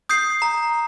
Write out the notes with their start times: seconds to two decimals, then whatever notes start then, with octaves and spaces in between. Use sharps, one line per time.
0.09 D#6 G6 C7
0.42 A#5